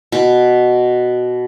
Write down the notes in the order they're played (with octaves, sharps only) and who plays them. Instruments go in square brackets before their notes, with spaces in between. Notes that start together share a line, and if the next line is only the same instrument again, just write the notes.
[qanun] B2